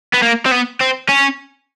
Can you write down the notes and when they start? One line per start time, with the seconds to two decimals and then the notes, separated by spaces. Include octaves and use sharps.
0.14 B3
0.23 A#3
0.46 C4
0.52 B3
0.81 C4
1.09 C#4